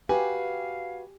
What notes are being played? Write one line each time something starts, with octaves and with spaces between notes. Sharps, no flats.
F#4 G4 B4 F5 G#5